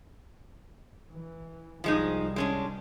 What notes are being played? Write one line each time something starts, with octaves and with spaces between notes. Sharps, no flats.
E3
C2 F3 G3 G#3 D#4
G#3 C#4 D4